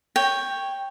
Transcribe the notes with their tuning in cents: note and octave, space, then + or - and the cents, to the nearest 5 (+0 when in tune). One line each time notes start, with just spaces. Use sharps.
C#5 -5 G5 +5